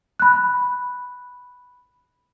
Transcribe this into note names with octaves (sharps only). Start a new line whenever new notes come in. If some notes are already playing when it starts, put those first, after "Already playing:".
B5 F#6